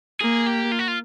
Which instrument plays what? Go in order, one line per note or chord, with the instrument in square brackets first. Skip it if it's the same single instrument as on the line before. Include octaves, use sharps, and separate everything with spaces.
[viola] A#3 [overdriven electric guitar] G#4
[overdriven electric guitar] G4
F4
F#4
F4